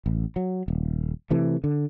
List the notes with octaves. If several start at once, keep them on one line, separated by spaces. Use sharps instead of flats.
A1
F#3
D#1
C3 E3 A3
D3